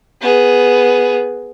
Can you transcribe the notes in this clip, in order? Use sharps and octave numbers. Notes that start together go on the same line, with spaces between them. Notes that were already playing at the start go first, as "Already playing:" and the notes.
B3 G#4